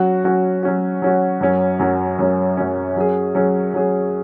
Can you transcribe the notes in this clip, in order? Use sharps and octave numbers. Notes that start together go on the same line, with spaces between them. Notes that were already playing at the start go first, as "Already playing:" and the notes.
Already playing: F#3 C#4 F#4
F#3 C#4 F#4
F#3 C#4 F#4
F#3 C#4 F#4
F#2 F#3 C#4
F#2 F#3 C#4
F#2 F#3 C#4
F#2 F#3 C#4
F#3 C#4 G#4
F#3 C#4 G#4
F#3 C#4 G#4